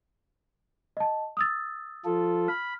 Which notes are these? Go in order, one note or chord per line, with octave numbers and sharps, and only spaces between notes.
D#5 A5
D#6 E6 A6
F3 F4 A4
B5 F6